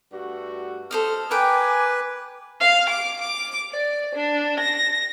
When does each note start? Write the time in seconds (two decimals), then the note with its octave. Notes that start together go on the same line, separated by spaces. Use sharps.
0.13 G2 A3 F#4
0.91 A4 C5 D#5 F6
1.31 A#4 B4 G5 G#5 D6
2.61 F5
2.89 D6
3.21 D6
3.72 D5
4.15 D4
4.60 A#6